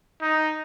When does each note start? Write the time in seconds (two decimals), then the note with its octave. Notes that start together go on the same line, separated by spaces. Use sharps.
0.21 D#4